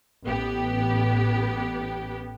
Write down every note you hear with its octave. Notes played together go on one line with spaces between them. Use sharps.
A1 B3 G4